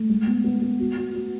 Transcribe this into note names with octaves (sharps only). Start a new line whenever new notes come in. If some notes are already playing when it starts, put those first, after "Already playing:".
Already playing: A3
G#3
B3
B3
B3
F#4
F#4
F#4